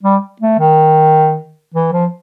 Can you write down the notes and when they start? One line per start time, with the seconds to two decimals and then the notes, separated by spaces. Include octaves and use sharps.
0.03 G3
0.41 A3
0.59 D#3
1.74 E3
1.92 F3